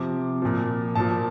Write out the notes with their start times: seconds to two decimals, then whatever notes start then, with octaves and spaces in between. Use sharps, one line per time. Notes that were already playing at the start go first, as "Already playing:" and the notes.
Already playing: C3 F3 D6
0.42 A#2 F3
0.95 A#2 F3 A5